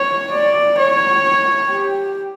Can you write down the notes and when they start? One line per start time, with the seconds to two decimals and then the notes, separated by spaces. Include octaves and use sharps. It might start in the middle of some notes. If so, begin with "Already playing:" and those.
Already playing: C#5
0.32 D5
0.79 C#5
1.70 G4